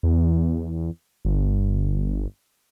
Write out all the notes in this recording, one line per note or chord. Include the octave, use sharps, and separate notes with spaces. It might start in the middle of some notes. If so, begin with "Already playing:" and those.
E2
G1